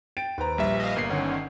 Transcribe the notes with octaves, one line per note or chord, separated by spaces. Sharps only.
G5 A6 D7
D#2 B4 C5 A#5
A#1 G3 E5
D#5 F5
G1 A#3 C7
D3 D#3 C#4 F#5